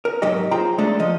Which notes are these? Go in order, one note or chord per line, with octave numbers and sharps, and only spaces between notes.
A#4
B1 G#2 F#3 D#4 G4 D#5
F4 G#4 C5 G5 A#5
G#3 A3 D4 A4
F3 D#5